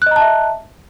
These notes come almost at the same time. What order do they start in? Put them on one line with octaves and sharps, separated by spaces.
F#6 D#5 A#5 A5 E5